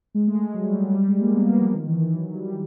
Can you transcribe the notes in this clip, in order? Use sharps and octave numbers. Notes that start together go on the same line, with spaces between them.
G#3
A3
G#3
F#3
G3
F#3
G3
F#3
G3
G#3
A#3
B3
A#3
F3
D#3
E3
E3
F#3
G3